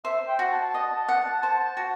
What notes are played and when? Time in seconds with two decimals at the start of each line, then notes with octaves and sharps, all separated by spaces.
0.05 C5 E5
0.28 G5
0.39 F#4
0.51 A5
0.69 A5
0.74 D#5
0.87 A5
1.05 F#5 A5
1.23 A5
1.41 C5 A5
1.60 A5
1.77 F#4